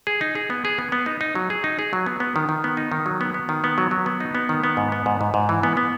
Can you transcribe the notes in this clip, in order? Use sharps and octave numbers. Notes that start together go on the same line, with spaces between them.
G#4
D#4
G#4
B3
G#4
B3
B3
D#4
D#4
F#3
G#4
D#4
G#4
F#3
B3
B3
D#3
D#3
B3
D#4
D#3
F#3
B3
B3
D#3
B3
F#3
F#3
B3
D#4
B3
D#3
B3
G#2
B3
G#2
G#2
G#2
E3
B3
B3